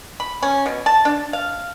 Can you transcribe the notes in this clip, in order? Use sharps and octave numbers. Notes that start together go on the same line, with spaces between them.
B5
C#4
B2
A5
D4
F5